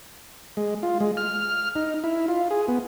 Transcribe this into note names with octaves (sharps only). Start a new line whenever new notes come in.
G#3
F4
G#3
F6
D#4
E4
F4
G#4
B3